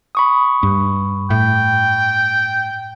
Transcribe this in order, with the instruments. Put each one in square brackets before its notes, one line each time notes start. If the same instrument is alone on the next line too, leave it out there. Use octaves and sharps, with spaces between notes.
[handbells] B5 C#6 D#6
[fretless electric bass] G2
[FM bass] A2 [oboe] G5